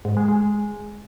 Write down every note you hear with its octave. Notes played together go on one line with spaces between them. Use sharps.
G#2
G#3
G#3